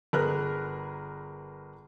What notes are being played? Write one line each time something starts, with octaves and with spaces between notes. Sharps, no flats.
G1 G#4 A#4 B4 F6 F#6